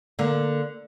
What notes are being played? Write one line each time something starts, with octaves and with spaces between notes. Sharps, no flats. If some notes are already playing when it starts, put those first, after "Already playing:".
D3 A#3